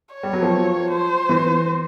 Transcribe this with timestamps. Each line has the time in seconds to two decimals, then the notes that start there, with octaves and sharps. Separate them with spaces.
0.15 C#5
0.23 G3
0.33 F#3
0.42 F3
0.91 C5
1.29 E3